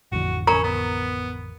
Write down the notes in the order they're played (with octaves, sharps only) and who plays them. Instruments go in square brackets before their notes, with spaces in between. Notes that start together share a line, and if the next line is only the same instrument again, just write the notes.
[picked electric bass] A1 F2 D3 [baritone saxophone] F#4
[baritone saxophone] C#4 [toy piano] A#4 A#5
[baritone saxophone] B3